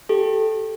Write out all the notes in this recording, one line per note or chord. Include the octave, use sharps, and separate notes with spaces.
G4 A4